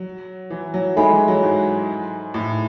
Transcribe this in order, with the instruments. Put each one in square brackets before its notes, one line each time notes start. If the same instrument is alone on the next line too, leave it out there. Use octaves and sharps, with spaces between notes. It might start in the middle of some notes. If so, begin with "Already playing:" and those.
Already playing: [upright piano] F#3
E3
F#3
[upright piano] G#3 [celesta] D#4 A4 E5 G#5 B5
[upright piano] E3
F#3
G#2
A2